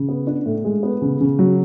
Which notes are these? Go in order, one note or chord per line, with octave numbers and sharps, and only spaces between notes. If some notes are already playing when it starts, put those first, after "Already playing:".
Already playing: C#3
B3
D4
A2
G#3
B3
C#3
C#3
F#3